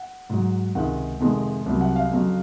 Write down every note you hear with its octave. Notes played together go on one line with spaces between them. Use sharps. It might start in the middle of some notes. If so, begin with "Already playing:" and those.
Already playing: F#5
G#2 F#3
C#2 C3 D#3 G#3 F#5
F2 C3 D#3 G#3
C2 C3 F#3
F#5
F5
F2 C#3 F#3